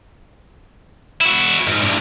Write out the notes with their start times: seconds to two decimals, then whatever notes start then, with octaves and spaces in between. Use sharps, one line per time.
1.21 E4 F#4
1.67 G#2
1.82 C2 G2